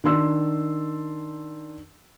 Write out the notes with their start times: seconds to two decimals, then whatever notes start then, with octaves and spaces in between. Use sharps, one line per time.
0.04 D#3 D4 C6 E6